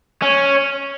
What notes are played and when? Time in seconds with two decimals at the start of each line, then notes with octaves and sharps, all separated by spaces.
0.22 C#4